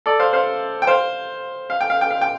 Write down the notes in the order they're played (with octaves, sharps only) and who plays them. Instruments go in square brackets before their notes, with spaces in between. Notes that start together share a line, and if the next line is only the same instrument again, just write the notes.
[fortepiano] A4 D5
C5 F5
C5 F5
G5
C5 F5
F5
G5
F5
G5
F5
G5